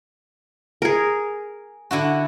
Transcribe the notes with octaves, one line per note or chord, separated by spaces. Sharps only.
G#4 A#4
D3 E4 F#4